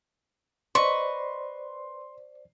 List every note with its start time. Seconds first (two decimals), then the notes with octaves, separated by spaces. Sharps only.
0.75 B4 C5 D5 D#5 C6 C#6